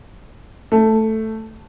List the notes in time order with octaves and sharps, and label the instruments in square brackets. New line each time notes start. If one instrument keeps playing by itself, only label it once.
[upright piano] A3